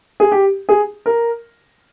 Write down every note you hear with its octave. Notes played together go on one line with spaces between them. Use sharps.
G#4
G4
G#4
A#4